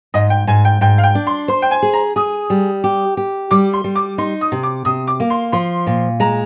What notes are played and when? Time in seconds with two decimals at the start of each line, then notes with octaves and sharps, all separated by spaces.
0.14 G#2 D#5
0.30 G5
0.47 G#2 G#5
0.65 G5
0.81 G#2 G5
0.98 F5
1.03 G5
1.15 D4
1.27 C6
1.48 C5 C6
1.62 G5
1.71 G#5
1.82 G#4
1.93 A#5
2.16 G#4 D#6
2.50 G3
2.84 G4
3.17 G4
3.51 G3 D6
3.73 C6
3.84 G3
3.95 D6
4.18 D#4 C6
4.41 D#6
4.52 C3
4.63 D6
4.85 C3 D#6
5.07 D6
5.20 A#3
5.30 C6
5.52 F3 C6
5.87 A#2
6.20 G#3 A#5